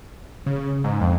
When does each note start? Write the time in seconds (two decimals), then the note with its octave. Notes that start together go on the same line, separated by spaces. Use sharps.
0.46 C#3
0.84 G#2
1.01 F2